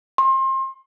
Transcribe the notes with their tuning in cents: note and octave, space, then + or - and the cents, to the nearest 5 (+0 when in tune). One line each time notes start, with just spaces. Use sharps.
C6 +30